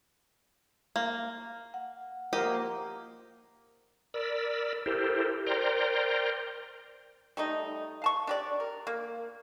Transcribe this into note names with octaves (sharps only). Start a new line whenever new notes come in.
A#3
F#5
F3 A#3 G4 D#5
A#4 D5 B5 E6
E4 G4 A4 A#4 C5
A#4 C5 D5 G5 A#5 C6
G3 A3 D#4
F5 A5 C#6
D4 G4 D5
A#4
A#3